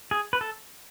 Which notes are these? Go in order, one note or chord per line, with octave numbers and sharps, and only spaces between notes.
G#4
B4
A4